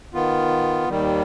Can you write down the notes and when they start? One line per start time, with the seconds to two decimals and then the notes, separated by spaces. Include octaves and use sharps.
0.14 D#3 B3 F4
0.89 D#2 D#3 G3